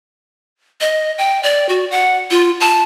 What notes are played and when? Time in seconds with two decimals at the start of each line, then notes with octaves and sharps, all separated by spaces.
0.81 D#5
1.18 G5
1.43 D5
1.69 F#4
1.91 F#5
2.31 F4
2.60 A5